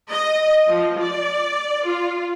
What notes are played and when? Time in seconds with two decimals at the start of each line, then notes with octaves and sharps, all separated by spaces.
0.11 D#5
0.68 F3
1.00 D5
1.85 F4